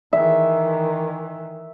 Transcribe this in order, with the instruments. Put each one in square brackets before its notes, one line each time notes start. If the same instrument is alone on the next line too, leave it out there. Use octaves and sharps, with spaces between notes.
[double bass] D#3 E3 [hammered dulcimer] E5